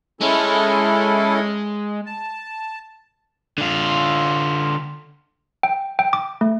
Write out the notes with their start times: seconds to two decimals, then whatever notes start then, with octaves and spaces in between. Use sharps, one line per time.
0.21 G#3 C#4 E4 A4
2.06 A5
3.58 D3 F4
5.63 G5
5.99 G5
6.13 D6
6.41 A3